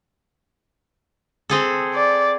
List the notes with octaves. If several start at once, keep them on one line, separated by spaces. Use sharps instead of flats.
C4 G#4 A4
D5